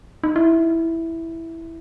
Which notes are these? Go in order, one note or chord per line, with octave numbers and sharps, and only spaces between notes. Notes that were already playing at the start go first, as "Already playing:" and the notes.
D#4
E4